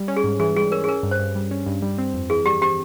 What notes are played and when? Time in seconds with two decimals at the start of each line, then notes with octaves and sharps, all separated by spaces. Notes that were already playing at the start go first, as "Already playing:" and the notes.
Already playing: G3
0.08 C#4
0.17 G#4
0.24 G#2
0.40 E3 G#4
0.56 G3 G#4
0.72 C#4 A#4
0.84 G#4
0.88 C#4 A#4
1.03 G2
1.11 C5
1.19 G2
1.35 G3
1.51 C#4
1.66 G2
1.82 G3
1.98 C4
2.14 F2
2.30 E3 G#4
2.46 G3 G4
2.61 C4 G4